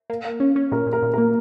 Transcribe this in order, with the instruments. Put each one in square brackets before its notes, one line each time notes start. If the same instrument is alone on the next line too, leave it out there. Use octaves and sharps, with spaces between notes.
[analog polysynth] A#3
A#3
C#4
C#4
[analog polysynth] A#2 [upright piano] A#4
[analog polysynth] A#2
[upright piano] A#4
[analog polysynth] A#2
[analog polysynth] A#3 [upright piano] A#4